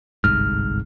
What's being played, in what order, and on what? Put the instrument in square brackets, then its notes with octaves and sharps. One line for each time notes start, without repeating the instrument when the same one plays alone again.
[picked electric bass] G1 C2 G#2 [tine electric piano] F6